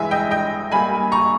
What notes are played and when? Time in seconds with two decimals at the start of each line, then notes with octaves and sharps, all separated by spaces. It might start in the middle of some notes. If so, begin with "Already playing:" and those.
Already playing: G2 E3 G#3 E5 G#5
0.11 D#5 G5
0.31 D#5 G5
0.72 G2 G3 A#3 G#5 B5
1.12 A#5 C#6